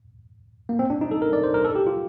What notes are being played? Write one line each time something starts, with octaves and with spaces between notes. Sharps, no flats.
A#3
C4
D4
D#4
A4
A#4
D5
C5
A#4
A4
G4
F4